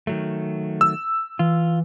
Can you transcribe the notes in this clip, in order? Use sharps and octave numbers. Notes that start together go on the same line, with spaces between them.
D#3 F#3 A3
E6
E3 F4